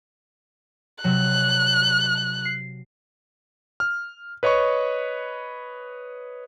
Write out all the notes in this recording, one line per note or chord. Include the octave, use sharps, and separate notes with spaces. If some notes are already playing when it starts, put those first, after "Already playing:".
C3 F#3 F#6
C7
F6
B4 C#5 D#5 B5 C#6